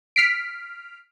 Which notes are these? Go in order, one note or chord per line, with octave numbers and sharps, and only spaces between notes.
F6 B6 C7 D7